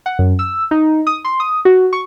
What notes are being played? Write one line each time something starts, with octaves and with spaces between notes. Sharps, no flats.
F#5
F#2
E6
D#4
D#6
C6
D#6
F#4
C#6